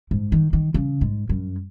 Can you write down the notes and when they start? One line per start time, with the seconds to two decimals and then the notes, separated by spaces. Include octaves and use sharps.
0.11 G#2
0.32 D#3
0.53 D#3
0.74 C#3
1.01 G#2
1.29 F#2